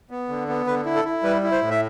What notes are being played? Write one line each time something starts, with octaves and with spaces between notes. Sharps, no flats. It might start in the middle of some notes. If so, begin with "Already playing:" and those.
B3
D3
B3
D3 B4
E4
A4
E4
G3 B4
E4
C5
A2
E5